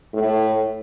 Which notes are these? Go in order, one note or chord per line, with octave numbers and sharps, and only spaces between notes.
A2